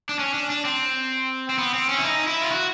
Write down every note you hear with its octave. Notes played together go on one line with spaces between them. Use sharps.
D4
C#4
D4
D4
C4
C4
B3
C4
C#4
E4
D#4
E4
F4
F#4